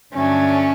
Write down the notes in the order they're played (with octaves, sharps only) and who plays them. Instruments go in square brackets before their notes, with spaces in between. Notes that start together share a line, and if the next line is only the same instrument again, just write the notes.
[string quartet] G2 D3 F#3 A3 D4 [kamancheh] C#4